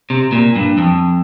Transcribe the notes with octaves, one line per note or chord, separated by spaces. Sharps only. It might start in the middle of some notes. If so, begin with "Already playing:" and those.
C3
A#2
G2
F2